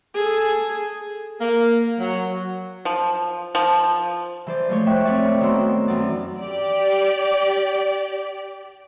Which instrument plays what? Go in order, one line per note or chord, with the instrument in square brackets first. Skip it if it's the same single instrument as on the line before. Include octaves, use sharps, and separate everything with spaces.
[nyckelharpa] G#4 A4
[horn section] A#3
F#3
[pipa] F3
F3
[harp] E3 C5 D5
F3 G#3 A3 C5 C#5
E5 G5 C#6 F#6
C4 B4 C#5 D5
D#3 B3 C4 F#4 C6 E6
F#2 E3 C4 C#4 D5
[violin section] G4 D5